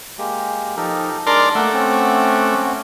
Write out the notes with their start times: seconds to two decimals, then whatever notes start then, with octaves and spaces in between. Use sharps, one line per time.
0.18 G#3 A#3 G4
0.77 F3 D#4 G4 A4 A#4
1.27 G#3 D4 D#4 A#4 D5 C6 D6
1.55 A3 A#3 E5 F#5 D6
1.74 C4 C#4